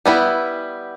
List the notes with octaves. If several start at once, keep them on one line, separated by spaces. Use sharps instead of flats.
G3 B3 E4 B4